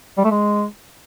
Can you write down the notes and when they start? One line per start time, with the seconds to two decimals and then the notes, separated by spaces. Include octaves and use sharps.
0.17 G3
0.24 A3
0.31 G#3